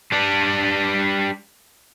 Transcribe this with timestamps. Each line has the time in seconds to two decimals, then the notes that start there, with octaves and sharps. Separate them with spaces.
0.12 G3 D4